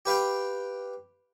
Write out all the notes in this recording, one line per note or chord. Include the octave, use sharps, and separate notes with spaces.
G4 B4 F5 G5